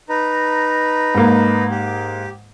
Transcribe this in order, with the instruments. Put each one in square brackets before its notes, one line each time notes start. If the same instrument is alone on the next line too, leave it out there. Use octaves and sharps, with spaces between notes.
[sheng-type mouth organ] D#4 B4 A#5
[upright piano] G#2 A#3
[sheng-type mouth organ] G4